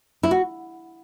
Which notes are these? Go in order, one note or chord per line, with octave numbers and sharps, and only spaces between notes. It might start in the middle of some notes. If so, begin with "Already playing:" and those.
E4
F#4